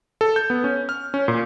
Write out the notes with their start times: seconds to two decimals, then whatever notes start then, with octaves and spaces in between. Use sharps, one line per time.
0.21 A4
0.36 G6
0.50 B3
0.64 C#4
0.89 F6
1.14 C#4
1.28 A#2